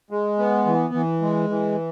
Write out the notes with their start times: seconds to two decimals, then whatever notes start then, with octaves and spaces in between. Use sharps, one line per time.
0.11 G#3
0.38 B3
0.66 E3
0.94 E3
1.22 G#3
1.50 E3